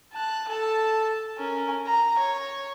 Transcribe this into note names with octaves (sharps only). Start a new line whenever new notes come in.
A5 F#6
A4 A5
C#4 A#4
A#5
C#5